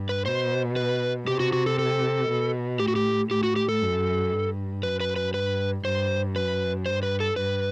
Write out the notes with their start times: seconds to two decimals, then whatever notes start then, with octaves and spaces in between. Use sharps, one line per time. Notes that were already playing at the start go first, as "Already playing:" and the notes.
Already playing: G2
0.09 B4
0.26 B2 C5
0.76 B4
1.27 C3 G4
1.40 F#4
1.53 F#4
1.66 A4
1.79 A4
2.29 B2
2.80 A2 G4
2.88 F#4
2.96 G4
3.31 A2 G4
3.43 F#4
3.56 G4
3.69 A4
3.82 F#2
4.32 G2
4.83 F#2 B4
5.00 B4
5.16 B4
5.34 G2 B4
5.85 G2 C5
6.35 F#2 B4
6.86 G2 C5
7.03 B4
7.20 A4
7.36 G2 B4